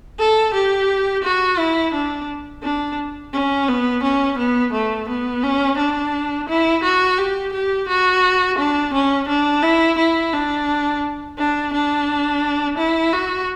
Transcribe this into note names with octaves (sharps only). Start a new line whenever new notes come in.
A4
G4
F#4
E4
D4
D4
C#4
B3
C#4
B3
A3
B3
C#4
D4
E4
F#4
G4
G4
F#4
D4
C#4
D4
E4
E4
D4
D4
D4
E4
F#4